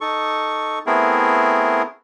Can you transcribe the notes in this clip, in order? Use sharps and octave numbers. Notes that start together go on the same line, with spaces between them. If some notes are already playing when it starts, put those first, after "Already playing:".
D#4 A4 C#6
A3 B3 C4 E4 G#4 A#4